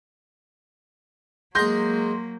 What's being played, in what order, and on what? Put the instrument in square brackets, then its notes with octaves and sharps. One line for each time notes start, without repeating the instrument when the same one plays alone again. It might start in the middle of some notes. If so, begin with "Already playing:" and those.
[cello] F#3 A#3 [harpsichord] G#3 G#4 [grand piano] C6 G6 A#6